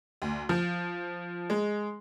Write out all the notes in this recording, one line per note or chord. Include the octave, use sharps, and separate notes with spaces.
D2
F3
G#3